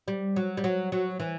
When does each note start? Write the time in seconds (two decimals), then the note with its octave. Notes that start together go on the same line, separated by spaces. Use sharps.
0.08 G3
0.36 F#3
0.57 G3
0.64 F#3
0.92 F#3
1.20 E3